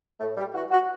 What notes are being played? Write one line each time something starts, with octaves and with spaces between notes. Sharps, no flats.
A2 A3
G3
E3 F#4
F#4